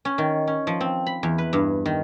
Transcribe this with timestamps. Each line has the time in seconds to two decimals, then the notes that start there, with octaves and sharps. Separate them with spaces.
0.05 C#4
0.18 D#3
0.47 C#4
0.67 F3
0.81 C4
1.07 B5
1.23 E2
1.38 B4
1.53 G2
1.86 D#3